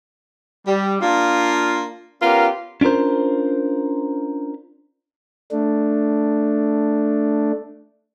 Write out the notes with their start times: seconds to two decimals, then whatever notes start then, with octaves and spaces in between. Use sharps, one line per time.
0.67 G3
1.01 A#3 D4 F4
2.22 B3 C#4 F4 G4 A#4
2.81 C#4 D4 F4 A#4 C5
5.51 A3 D4